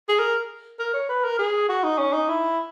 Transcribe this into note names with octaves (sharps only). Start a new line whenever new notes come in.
G#4
A#4
A#4
C#5
B4
A#4
G#4
F#4
D#4
C#4
D#4
E4